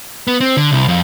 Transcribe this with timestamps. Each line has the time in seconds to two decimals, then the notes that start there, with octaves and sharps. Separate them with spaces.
0.27 B3
0.41 C4
0.57 D3
0.72 C2
0.88 F2